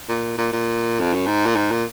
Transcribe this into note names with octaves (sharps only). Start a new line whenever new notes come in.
A#2
A#2
A#2
F2
F#2
G#2
A#2
G#2
A#2